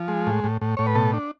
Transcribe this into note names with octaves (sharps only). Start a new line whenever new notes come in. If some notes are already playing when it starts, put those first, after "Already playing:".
Already playing: F3
G#3
A2
A2
A2
A2 C#5
B4
B2 A4
D4